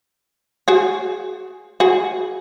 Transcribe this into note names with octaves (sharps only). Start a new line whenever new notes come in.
F#4 G#4
F#4 G#4